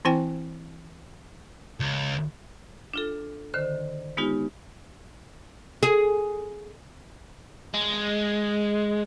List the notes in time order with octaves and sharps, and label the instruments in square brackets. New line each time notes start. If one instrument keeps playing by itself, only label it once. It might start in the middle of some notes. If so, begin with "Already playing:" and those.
[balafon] E3 C4 E4 C5 G5 G#5
[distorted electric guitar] C#2
[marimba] D4 F4 A4
D3 D#3 C5
G#3 B3 D#4 F4 G4
[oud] G#4
[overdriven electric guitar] G#3